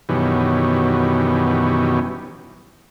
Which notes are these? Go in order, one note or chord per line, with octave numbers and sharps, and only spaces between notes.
F#2 B2 D#3 E3 G3 C#4